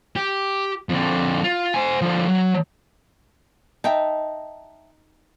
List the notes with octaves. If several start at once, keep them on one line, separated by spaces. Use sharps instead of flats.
G4
F2 D3
F4
C5 G#5
D3 F3
F#3
D#4 E5 G5 A5